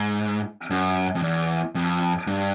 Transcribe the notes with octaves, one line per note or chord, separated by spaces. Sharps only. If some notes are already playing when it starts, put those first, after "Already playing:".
Already playing: G#2
F#2
F2
E2
F2
G2